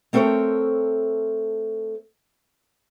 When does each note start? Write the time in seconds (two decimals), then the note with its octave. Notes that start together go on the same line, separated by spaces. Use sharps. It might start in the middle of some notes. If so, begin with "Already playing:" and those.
0.13 A3 C4 A4 A#4 C5 C#5